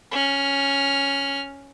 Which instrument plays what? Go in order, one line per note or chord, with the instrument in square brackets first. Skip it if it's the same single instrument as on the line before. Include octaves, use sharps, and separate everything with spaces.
[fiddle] C#4 F6